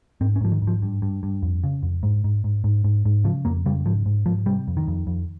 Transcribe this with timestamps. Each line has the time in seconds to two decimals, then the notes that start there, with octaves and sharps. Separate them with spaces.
0.21 G#2 C4
0.36 C#4
0.41 G#2 F3
0.52 D#3
0.62 G#2
0.67 F3
0.82 G2
1.02 G2
1.23 G2
1.43 F2
1.64 C#3
1.83 F2
2.03 G#2
2.24 G#2
2.44 G#2
2.64 G#2
2.84 G#2
3.05 G#2
3.24 C#3 F3
3.45 F2 A#3
3.66 C#3 G3
3.85 G#2 F3
4.06 G#2
4.26 G#2 F3
4.46 C3 G3
4.68 F2
4.77 D#3
4.88 F2
5.07 F2